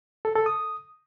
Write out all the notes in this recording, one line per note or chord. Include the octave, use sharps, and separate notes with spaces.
A4
A4
D#6